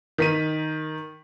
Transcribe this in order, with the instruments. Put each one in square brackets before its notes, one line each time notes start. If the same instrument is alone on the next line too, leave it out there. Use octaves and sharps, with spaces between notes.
[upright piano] D#3 B6 D#7